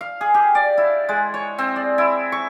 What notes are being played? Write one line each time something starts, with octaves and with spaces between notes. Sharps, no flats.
F5
G#4
G4
D5
E4
G#3
C#5
C4
D5
E4
C#6